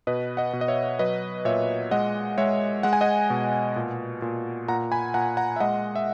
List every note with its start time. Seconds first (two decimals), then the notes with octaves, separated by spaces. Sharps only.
0.07 B2 B4 D#5
0.37 D#5 F#5
0.53 B2
0.61 D#5
0.68 C#5 E5
0.99 F#3 B4 D#5
1.45 A#2 C#5 E5
1.91 G#3 D#5 F#5
2.38 G#3 C#5 E5
2.83 G#3 F#5
2.93 G#5
3.01 D#5 F#5
3.30 B2
3.76 A#2
4.22 A#2
4.68 A#2 F#5 A#5
4.92 G#5 B5
5.14 A#2 F#5 A#5
5.37 F#5 A#5
5.56 E5
5.60 G#3 D#5 F#5
5.96 E5